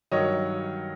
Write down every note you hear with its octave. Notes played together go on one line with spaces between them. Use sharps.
G2 D#3 F#3 C#5 D#5